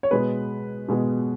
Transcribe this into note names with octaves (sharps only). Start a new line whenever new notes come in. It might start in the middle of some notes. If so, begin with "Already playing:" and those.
C#5
B2 G#3 B3 B4
B2 G#3 B3